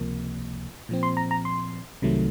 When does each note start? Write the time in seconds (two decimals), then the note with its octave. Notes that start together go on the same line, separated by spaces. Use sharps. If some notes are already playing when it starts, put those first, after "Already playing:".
Already playing: C#2 C3 F3 A#3
0.89 A#2 F3 C4
1.03 C6
1.17 A#5
1.31 A#5
1.45 C6
2.02 C2 C3 D#3 F#3 A3